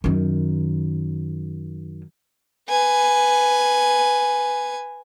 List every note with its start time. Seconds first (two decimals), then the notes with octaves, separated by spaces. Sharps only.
0.04 F#2 D#3
2.69 B4 G#5